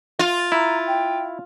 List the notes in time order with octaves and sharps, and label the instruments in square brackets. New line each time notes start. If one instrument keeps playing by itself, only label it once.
[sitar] F4
[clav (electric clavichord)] E4 [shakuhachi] A#5
[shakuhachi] G5